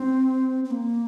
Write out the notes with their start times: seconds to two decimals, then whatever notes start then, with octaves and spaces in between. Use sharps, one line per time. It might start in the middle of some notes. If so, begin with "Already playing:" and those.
Already playing: C4
0.65 C4
0.71 A#3